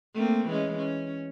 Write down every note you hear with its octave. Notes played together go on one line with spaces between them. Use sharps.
A3 A#3 C4
E3 G#3 C#4
C#4